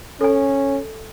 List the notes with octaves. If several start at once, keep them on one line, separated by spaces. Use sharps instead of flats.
C#4 A4 G#5